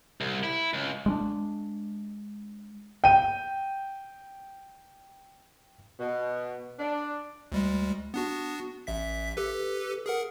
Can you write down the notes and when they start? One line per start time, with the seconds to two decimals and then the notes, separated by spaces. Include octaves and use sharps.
0.21 C2
0.44 E4
0.73 C#2
1.06 G#3 C#4 D4
3.04 G5 D#7
5.99 B2
6.79 D4
7.52 D2 G3 G#3
8.14 B3 D4 F#4
8.87 A1 E5 B6
9.37 G4 A4 B4
10.06 G#4 A#4 F#5